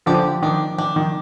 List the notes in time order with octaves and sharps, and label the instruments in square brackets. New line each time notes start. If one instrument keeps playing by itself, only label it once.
[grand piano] D3 F3 [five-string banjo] G4
[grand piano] D#3 [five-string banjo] D4
[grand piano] D#3 [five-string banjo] D4
[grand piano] D#3